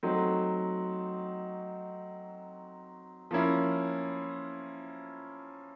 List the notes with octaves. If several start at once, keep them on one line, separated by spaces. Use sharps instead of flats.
F#3 A3 C4 D#4 F#4
F3 A#3 C#4 E4